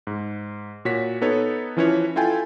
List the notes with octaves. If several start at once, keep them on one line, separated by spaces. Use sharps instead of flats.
G#2
A#2 F#4 C#5 B6
B3 D#4 A4 B4 C#5
E3 F3 C#4 E4 B4 C#5
E4 F4 A4 G5 G#5